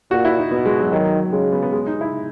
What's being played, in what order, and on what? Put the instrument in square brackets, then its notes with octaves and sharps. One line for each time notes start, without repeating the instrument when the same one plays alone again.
[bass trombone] A#2 [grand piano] F#4
[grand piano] E4
D#4
[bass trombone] B2 [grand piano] B3
[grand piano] G#3
F#3
[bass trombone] D#3 [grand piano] F#3
[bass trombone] C#3 [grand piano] G#3
[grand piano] B3
B3
G#3
D#4
E4